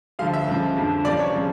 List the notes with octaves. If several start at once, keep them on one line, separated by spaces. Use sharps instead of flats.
D2 D3 F3 F5
E5
C#2 C#3 F3
F2 D3 F3
C#2 C3 F3 D5
C#5
C#3 F3